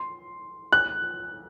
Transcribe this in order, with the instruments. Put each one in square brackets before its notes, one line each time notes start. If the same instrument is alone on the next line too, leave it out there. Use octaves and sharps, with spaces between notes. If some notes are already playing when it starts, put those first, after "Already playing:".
Already playing: [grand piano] C6
F#6